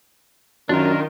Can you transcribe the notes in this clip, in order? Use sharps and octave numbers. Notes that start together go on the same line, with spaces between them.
F#2 D#3 D4 F4 A#4